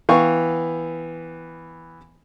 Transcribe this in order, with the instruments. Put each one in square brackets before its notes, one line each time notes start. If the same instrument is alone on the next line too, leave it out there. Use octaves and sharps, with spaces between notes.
[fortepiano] E3 B3 F5 G5 C#6